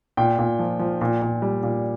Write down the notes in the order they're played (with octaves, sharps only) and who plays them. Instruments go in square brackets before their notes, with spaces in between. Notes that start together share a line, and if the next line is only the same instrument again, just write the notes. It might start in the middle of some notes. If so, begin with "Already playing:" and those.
[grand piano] A#2 G5
A#2
F3
F3
A#2
A#2
G3
A#2